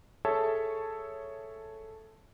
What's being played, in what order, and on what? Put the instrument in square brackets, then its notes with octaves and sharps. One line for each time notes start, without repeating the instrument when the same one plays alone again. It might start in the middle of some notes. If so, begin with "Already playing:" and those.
[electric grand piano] G#4 A4 C#5 E5 A5